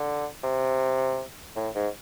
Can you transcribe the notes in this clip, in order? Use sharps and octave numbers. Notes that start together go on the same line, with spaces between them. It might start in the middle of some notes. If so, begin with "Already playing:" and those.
Already playing: D3
C3
A2
G#2